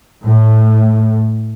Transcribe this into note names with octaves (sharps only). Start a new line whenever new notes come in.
A2